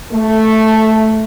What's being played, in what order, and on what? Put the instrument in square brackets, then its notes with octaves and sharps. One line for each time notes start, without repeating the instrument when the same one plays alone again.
[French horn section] A3